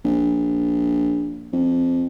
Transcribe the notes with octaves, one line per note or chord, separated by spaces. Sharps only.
A#1
F2